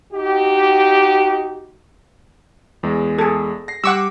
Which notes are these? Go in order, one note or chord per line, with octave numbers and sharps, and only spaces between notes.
D#4 F#4 G4
E2 G#3
G#4 A4
A#6 C7
G3 F#5 C#6 D6 E6